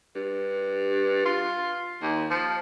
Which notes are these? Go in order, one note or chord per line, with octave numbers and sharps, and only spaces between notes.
G2
F4
D#2
F3